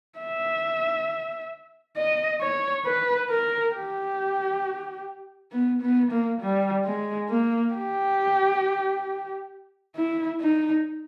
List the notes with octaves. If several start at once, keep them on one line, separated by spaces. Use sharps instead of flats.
E5
D#5
C#5
B4
A#4
G4
B3
B3
A#3
G3
G#3
A#3
G4
E4
D#4